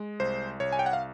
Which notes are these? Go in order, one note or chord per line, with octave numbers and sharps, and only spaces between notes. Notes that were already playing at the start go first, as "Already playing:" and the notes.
Already playing: G#3
C2 C5
C2 C#5
G#5
G5
F#5
F5